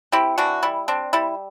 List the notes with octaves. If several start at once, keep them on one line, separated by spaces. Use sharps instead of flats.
C4 E4 G4
E3 D4 F#4
G3 E4
C4 D4
G3 E4